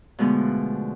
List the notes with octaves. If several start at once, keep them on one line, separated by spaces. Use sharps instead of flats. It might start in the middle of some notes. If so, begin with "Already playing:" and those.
B2 D3 F3 G#3 A3 B3